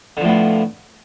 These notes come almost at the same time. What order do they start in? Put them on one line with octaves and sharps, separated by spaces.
D3 F3 A2 B3